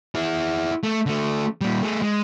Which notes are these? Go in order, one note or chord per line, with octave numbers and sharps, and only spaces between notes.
E4 G#4
A3
D3 A3
A#2 G3
A3 G#4
G#3